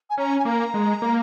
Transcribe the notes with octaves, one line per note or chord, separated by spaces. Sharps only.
G#5
C#4 A#5
G#5
A#3 A#5
G#3
A#3